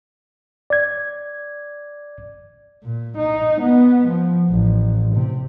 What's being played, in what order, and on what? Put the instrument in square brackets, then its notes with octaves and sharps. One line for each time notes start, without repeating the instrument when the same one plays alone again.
[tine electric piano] D5 G#6
[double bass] A#2
D#4
B3
F3
A1
C3